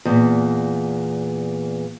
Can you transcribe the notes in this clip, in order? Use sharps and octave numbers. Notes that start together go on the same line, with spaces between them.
E2 A#2